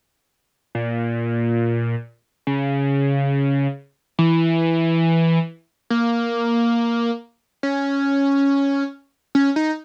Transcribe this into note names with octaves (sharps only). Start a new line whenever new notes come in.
A#2
C#3
E3
A#3
C#4
C#4
D#4